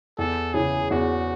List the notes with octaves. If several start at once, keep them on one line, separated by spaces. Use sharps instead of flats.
E2 A4
C#3 E3 G#4
E2 F#4